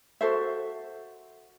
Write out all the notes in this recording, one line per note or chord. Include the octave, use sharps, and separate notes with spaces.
F#4 A4 C5 E5